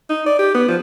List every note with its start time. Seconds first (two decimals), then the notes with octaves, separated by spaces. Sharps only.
0.10 D#4
0.26 D5
0.39 G4
0.54 B3
0.68 F3